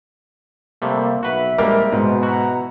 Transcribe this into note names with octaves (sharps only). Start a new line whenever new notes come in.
C3 G3 A3 A#3
B1 F#4 B4 E5
A#1 G3 G#3 A#3 G4 A#4 F6
G#2 B2
E4 F#4 A#5